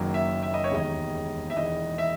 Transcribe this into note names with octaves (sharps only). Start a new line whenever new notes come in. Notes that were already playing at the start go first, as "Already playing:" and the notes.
Already playing: F#1 F#2 D#3 F#3 A#3
E5
E5
D#5
C#5
E1 D#2 D#3 G#3 D#5
E5
E1 E2 D#3 D#5
E5